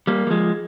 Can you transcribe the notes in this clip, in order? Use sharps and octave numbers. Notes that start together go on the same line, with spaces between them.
G3 A#3
G3
F3 G#3